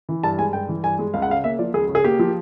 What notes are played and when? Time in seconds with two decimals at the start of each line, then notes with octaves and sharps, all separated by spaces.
0.09 E3
0.23 G2 A5
0.38 G#3 G#5
0.53 G2 G5
0.69 E3
0.83 G2 G#5
0.99 G#3
1.14 C#2 F5
1.22 F#5
1.29 C#3 F5
1.44 A#3 E5
1.59 F3 D5
1.74 C#2 G#4
1.89 C#3
1.95 G#4
2.04 A#3 G4
2.19 F3